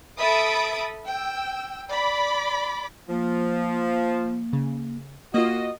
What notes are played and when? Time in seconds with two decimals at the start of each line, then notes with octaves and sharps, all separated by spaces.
0.18 A4 E5 B5 D#6 A6 D7
1.05 G5 E6
1.88 D5 B5 D6
3.09 F3 A#3
4.53 C#3
5.34 A#3 F4 F#4 D#5